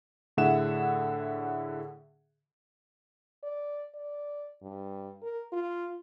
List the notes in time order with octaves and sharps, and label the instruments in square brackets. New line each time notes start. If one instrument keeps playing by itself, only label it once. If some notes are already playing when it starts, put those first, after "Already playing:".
[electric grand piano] A2 D3 G#4 E5 F#5 E7
[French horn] D5
D5
G2
A#4
F4